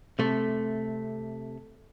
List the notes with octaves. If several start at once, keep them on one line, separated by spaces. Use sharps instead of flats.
C3 A3